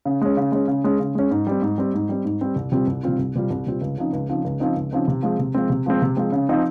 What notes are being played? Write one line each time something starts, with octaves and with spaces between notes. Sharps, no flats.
C#3
G#3 C#4
C#3
G#3 C#4
C#3
G#3 C#4
C#3
G#3 C#4
G#2
G3 C4
G#2
G3 C4
G#2
G3 C4
G#2
G3 C4
C2
C3 G3 C4 F4
C2
C3 G3 C4 F4
C2
C3 G3 C4 F4
C2
C3 G3 C4 F4
C#2
C#3 F3 C4 D#4
C#2
C#3 F3 C4 D#4
C#2
C#3 F3 C4 D#4
C#2
C#3 F3 C4 D#4
C3
F3 G#3 C4
C3
F3 G#3 C4
C3
F3 G#3 C4
C3
F3 G#3 C4
C#3
F3 C4 D#4